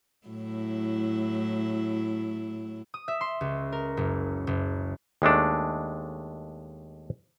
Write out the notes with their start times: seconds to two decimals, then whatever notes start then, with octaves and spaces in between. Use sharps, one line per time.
0.27 A2 F#3 E4
2.94 D#6
3.08 E5
3.21 C6
3.41 C#2
3.72 A#4
3.97 F#1
4.47 F#1
5.22 D#2 G#3 A3 D4